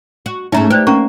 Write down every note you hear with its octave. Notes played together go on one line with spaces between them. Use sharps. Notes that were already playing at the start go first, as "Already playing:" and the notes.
F#4
G#2 A3 C#4 D#4 E5 A#5
G4 B4 C5 D5
A#3 C#4 A#5 C#6